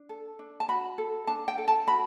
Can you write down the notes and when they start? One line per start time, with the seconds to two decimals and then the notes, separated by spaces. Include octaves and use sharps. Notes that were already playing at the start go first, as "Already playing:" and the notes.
Already playing: D4
0.09 A4
0.39 D4
0.60 A5
0.68 F#4 B5
0.98 A4
1.27 D4 A5
1.48 G5
1.58 A4
1.68 A5
1.87 F#4 B5